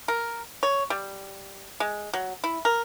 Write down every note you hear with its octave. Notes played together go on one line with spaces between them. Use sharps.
A#4
C#5
G3
G#3
F#3
E4
A#4